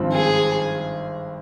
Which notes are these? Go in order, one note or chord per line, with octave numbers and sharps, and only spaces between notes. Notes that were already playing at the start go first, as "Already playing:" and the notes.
Already playing: G#1 G2 F3 C4 F4
G#4